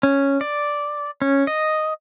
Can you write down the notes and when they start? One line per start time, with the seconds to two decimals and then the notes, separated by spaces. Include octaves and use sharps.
0.03 C#4
0.41 D5
1.22 C#4
1.47 D#5